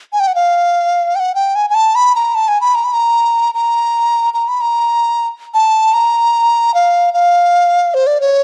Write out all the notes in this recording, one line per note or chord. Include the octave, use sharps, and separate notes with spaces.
G#5
G5
F#5
F5
G5
F#5
G5
G#5
G#5
A5
B5
A#5
A5
G#5
B5
A#5
B5
A#5
A#5
A#5
B5
A#5
A5
A#5
F5
F5
C5
D5
C#5